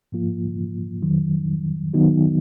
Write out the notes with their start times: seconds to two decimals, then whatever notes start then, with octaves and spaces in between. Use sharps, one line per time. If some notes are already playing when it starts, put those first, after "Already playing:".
0.12 G#2 F3 A#3 F4
1.02 F2 D#3 F#3
1.94 D#3 F#3 B3 D#4 F#4